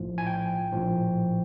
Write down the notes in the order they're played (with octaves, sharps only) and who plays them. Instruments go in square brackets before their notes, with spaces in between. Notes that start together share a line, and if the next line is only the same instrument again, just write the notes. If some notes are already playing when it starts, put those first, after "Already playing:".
Already playing: [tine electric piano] A#1 A2 F3
G#5
G5
A#1 A2 F3